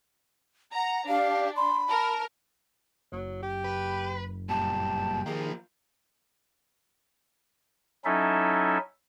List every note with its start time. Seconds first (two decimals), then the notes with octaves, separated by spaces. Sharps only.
0.75 F#5 A#5
1.09 D4 G4 F5
1.56 B5 C6
1.89 A#4 A5
3.12 F#1 F#3
3.42 G4
3.64 B4
4.49 G2 A#2 G4 A5
5.26 D#3 F3 A#3 G#4
8.05 F#3 C#4 D#4 E4 A4 E5